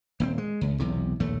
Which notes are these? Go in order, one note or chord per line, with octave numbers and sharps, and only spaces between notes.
D#1 B3 C4
G#3
C#2
B1 E2 C3
A#1 D#2 A3